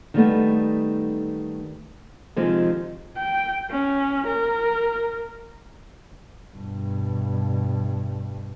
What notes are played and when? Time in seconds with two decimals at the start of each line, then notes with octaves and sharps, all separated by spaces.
0.14 D#3 G3 A3 B3
2.36 C3 D#3 F3 G#3
3.17 G5
3.70 C#4
4.27 A#4
6.54 G2 B2